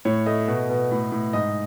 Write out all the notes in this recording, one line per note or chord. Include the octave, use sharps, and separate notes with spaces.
A2 C#5
A3 D#5
B2
B2
A2
A2
G#2 D#5